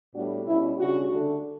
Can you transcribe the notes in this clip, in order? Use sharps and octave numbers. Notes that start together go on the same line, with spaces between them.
A2 G3 B3 D4 F#4
B2 G3 C#4 E4
C#3 G3 D4 F#4
D3 A3 D4